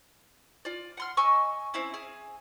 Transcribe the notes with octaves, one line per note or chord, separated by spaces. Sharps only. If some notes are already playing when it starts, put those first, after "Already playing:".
F4 D5
F#5 C6 F6
D#5 G#5 C#6 E6
C4 C#4 E4
G#4